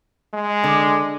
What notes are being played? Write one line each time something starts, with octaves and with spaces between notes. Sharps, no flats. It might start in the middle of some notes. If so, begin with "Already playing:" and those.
G#3
D3